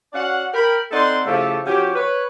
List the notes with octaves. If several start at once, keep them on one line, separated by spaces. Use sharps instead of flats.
C#4 F#4 D5 F5 F#5
A#4 G5 B5
C4 D#4 A4 D5 F#5 C6
C#3 F3 A3 E4 G4 A4
F3 C#4 F#4 G4
B4 C#5